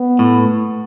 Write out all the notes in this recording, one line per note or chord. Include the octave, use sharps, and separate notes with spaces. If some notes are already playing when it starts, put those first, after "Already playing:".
Already playing: B3
A2